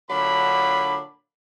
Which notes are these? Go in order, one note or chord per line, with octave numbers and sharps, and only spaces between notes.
A#2 D3 F#3 D4 B5